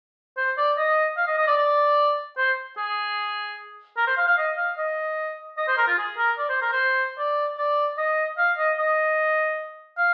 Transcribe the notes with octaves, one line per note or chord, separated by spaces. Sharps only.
C5
D5
D#5
F5
D#5
D#5
D5
D5
C5
G#4
A#4
C5
F5
F5
D#5
F5
D#5
D#5
C5
A#4
F4
G#4
A#4
D5
C5
A#4
C5
D5
D5
D#5
F5
D#5
D#5
F5